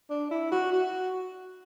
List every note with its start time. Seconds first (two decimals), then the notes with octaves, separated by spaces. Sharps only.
0.10 D4
0.31 E4
0.52 F#4
0.72 F#4